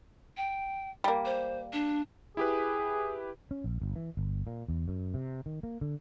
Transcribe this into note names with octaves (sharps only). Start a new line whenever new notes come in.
G5
G3 A#3
C5
D4
E4 G4 G#4 B4
C#4
A#1
G1
E3
G1
A#2
E2
F#2
C3
D#3
A#3
D3